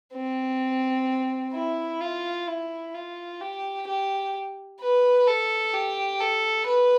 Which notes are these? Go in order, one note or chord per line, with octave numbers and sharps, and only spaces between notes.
C4
E4
F4
E4
F4
G4
G4
B4
A4
G4
A4
B4